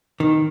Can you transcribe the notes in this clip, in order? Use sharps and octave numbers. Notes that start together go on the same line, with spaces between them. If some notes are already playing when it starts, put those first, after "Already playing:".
D#3